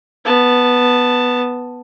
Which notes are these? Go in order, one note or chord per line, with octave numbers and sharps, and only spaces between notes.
B3 A5